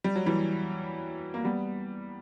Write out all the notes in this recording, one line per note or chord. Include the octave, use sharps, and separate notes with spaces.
G3
F#3
E3 G3
A#3
G3 B3